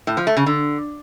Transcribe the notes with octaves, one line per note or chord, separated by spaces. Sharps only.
A2
F3
A3
C#3
D3